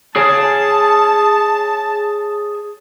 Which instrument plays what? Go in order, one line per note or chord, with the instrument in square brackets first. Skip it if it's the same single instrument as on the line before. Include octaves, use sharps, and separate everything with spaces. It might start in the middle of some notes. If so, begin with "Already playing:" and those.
[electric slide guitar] G#4 C#5 G#5 [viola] A5